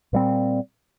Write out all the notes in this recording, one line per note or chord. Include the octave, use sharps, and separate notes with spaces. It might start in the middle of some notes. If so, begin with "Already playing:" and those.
A#2 G3 C4